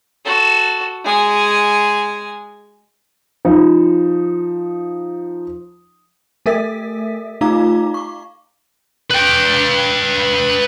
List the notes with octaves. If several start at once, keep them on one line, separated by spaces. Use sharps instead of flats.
F#4 A4
G#3 G#5
F3 D#4
A3 A4 A#4 E5 B6
A3 D#4 F4 F5 A#5 D6
C#6 D6
B4 G5